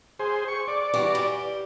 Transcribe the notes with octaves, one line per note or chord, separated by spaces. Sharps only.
G#4 C5
C#6
D5
E3 G3 F#4
G3